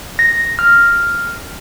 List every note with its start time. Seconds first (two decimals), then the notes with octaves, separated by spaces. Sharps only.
0.19 A#6
0.59 F6